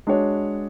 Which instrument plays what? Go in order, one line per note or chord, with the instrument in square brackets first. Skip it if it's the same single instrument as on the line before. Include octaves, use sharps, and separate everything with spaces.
[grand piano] G#3 D4 F#4 C#5